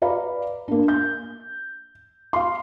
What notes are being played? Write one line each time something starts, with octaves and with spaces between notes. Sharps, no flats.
B4 D5 F5 A#5 B5
A#3 D4
G6
F5 C6